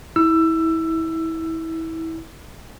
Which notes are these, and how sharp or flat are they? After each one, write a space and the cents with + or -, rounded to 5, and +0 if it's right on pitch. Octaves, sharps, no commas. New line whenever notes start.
E4 -25 E6 +20